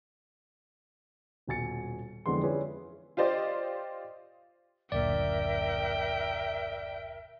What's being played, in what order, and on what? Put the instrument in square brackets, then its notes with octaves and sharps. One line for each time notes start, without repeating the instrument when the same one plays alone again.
[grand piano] D#1 B2 G#5 A6 C#7
F2 D3 E3 G#3 B3 C6
C#4 E4 F4 G#4 B4 D5
[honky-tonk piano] F4 G4 C5 D5 D#5
[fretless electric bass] F#1 D2 A#2 [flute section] A#4 E5 [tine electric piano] D5 [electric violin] G5